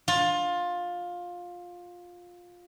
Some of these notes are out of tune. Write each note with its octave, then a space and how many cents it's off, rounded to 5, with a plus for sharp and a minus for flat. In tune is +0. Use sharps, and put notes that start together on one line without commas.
F4 +15